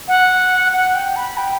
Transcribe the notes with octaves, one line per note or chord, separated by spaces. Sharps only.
F#5
F#5
G5
B5
G5